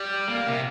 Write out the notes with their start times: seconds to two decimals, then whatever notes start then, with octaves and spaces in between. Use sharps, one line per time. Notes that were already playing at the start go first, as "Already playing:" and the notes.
Already playing: G3
0.29 A#3
0.46 C3